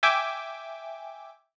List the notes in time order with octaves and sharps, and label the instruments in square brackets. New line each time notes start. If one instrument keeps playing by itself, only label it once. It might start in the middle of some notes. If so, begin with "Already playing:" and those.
[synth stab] E5 G5 G#5 D6